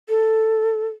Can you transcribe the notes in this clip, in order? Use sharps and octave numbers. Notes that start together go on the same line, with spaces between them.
A4